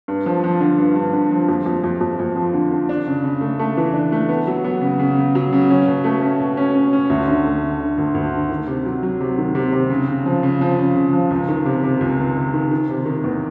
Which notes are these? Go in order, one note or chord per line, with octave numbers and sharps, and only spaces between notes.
G2
F3
F3
D3
G2
G2
D3
F3
F2
F2
F2
F2
F2
F3
D3
D3
D4
C#3
C#3
A3
A3
E3
D4
A3
B3
F#3
B3
C#3
C#3
C#3
F#3
C#3
C#4
B2
A3
C#4
B2
C#4
C#4
C#4
D2
D3
A3
D3
D3
D2
D2
D3
D#3
C3
F#3
F#3
C3
D#3
C3
C3
C#3
C#3
F3
C#3
F3
C#3
C#3
F3
C#2
D#3
C3
C3
C#2
C#2
C#2
D#3
D#3
C3
D#3
E2